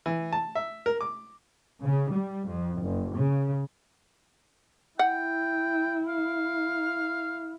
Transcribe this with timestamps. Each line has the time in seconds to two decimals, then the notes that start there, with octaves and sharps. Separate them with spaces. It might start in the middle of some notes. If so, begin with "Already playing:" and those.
0.06 E3
0.33 A5
0.55 E5
0.86 A#4
1.01 D6
1.81 C#3
2.11 G3
2.47 F2
2.81 F#1
3.15 C#3
4.99 E4 F#5 G5
6.08 F5